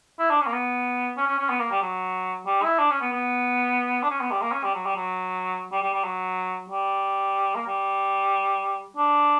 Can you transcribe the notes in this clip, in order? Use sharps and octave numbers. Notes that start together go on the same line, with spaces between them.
E4
D4
C#4
A#3
B3
C#4
C#4
C#4
B3
A#3
G3
F#3
G3
E4
D4
C#4
B3
B3
D4
C#4
B3
G3
A#3
C#4
G3
F#3
G3
F#3
G3
G3
G3
F#3
G3
A#3
G3
D4